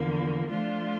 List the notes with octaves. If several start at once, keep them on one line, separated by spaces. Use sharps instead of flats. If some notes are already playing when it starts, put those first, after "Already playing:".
Already playing: E2 D3 F3 A#3
F3 A3 D4 F4